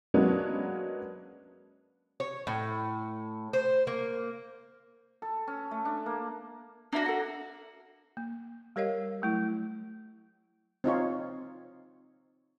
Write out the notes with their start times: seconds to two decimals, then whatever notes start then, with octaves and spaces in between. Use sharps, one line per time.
0.14 F#3 G#3 A#3 B3 C#4 D4
2.20 C#5
2.47 A2
3.53 C5
3.87 A#3
5.22 A4
5.47 C#4
5.71 A3
5.85 D4
6.06 A#3
6.93 A#3 D4 F#4 E5
7.06 A4 F#5
8.17 A#3
8.76 G3 G4 A#4 C#5 D#5 F5
9.22 F#3 A3 E4
10.84 C4 D#4 F4 C#5